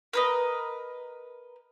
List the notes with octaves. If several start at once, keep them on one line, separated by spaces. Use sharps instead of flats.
A#4 B4 D#5